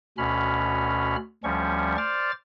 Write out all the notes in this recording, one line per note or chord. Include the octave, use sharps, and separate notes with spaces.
D2 B2 C#4 B5 F6
D2 F3 G3 C#4 C#6
C5 D5 D6 F6 A6